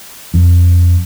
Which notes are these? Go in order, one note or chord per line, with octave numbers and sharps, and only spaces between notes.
F2